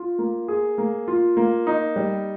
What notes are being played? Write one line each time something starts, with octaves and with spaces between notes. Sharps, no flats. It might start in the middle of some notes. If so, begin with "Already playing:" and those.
Already playing: F4
A#3
G#4
A#3
F4
A#3
D#4
G3